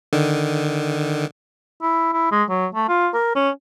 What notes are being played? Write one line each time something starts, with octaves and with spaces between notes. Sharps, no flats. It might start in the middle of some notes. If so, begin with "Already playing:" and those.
D3 D#3
E4
E4
G#3
F#3
A3
F4
A#4
C#4